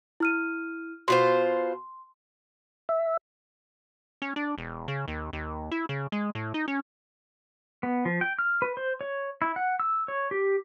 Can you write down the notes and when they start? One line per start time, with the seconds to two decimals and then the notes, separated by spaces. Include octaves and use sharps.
0.20 E4 F6 D#7
1.08 B2 F4 C5 C6
2.89 E5
4.22 C#4
4.36 D4
4.58 E1
4.88 C#3
5.08 D#2
5.33 D#2
5.71 E4
5.89 C#3
6.12 G#3
6.35 A2
6.54 D#4
6.68 C#4
7.83 B3
8.05 F3
8.21 G5
8.39 F6
8.62 B4
8.77 C5
9.01 C#5
9.42 E4
9.56 F#5
9.80 E6
10.08 C#5
10.31 G4